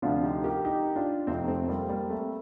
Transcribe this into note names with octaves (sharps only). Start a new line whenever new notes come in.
D2 C3 F3 D4 F4
D#4 G4
G4 A#4
D#4 G4
D4 F4
F1 F2 C3 F3 C4 D#4
A3 C4
G3 A#3
G3 A#3
A3 C4